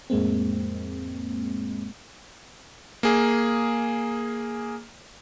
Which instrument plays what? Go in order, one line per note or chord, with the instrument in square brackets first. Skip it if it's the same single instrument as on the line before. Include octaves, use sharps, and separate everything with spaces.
[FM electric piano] F2 A2 G#3 A#3 C4
[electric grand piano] A#3 G#4